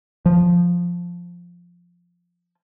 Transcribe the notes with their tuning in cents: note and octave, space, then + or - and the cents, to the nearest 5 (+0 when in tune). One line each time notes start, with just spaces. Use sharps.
F3 +5